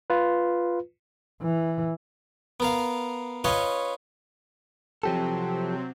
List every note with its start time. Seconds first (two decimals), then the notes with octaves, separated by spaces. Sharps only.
0.10 F4 B4
1.42 E3
2.60 B3 A#4 F5
3.44 C#4 F4 B4 C#5 D#5
5.03 C3 F3 F#3 C4 G4 A4